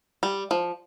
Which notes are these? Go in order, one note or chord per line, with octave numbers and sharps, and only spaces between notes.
G3
F3